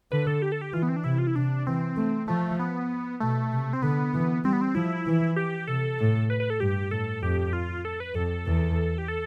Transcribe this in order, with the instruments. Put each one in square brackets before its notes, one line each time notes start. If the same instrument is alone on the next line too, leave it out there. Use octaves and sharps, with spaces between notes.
[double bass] D3 [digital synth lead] B4
[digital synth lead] A4
G4
A4
G4
[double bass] E3 [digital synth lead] F4
[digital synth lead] B3
C4
D4
[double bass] C3 [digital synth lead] E4
[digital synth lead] F4
E4
[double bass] C3 [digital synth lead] D4
[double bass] E3 [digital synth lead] C4
[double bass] A3
[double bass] F3 [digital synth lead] A3
[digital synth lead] B3
[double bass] B2 [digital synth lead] A3
[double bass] C3
[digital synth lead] C4
[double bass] D3 [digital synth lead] B3
[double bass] E3
[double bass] G3 [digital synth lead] C4
[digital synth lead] B3
C4
[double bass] F3 [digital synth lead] E4
[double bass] E3
[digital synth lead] G4
[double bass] C3 [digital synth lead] A4
[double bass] A2
[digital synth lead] B4
B4
A4
[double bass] G2 [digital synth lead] G4
[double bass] A2 [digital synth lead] A4
[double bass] F2 [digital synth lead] G4
[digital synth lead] F4
A4
B4
[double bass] F2 [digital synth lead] A4
[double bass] E2
[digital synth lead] G4
A4